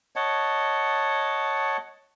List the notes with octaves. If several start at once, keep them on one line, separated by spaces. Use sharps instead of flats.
C#5 D#5 F#5 A5